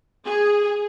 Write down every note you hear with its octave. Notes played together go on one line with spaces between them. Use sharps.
G#4